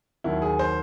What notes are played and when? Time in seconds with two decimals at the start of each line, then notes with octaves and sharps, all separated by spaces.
0.24 D#2 D#3 F#3 E4
0.42 G#4
0.59 C5